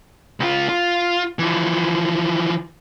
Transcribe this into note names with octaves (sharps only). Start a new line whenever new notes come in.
C#2 F4
F4
E3 F3